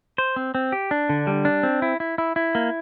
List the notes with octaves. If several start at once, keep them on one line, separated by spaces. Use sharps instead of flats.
C5
C4
C4
G4
D4
D3
G3
D4
C4
E4
E4
E4
E4
A#3